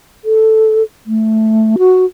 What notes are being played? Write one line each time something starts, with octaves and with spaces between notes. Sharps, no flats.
A4
A3
F#4